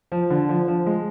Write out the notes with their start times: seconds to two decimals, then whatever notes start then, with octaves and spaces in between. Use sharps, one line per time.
0.12 F3
0.30 D3
0.49 F3
0.68 F3
0.87 G#3